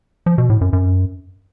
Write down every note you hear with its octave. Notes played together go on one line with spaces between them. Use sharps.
F3
B2
A2
F#2
F#2